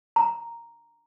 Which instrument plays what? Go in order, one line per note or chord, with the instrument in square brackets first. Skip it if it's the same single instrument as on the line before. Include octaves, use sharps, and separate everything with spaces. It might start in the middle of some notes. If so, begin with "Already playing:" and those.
[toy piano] A#5